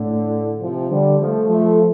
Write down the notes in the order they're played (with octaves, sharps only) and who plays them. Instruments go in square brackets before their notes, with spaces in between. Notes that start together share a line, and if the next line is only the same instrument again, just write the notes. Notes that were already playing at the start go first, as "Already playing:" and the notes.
Already playing: [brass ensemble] A2 D3
C3 F3
D3 G3
F3 A3
F3 A3